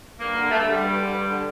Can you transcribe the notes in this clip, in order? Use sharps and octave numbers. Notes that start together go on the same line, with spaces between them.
G2 A#3
D3
G2 A3
A3
D3 G3
G2
D3
G2
D3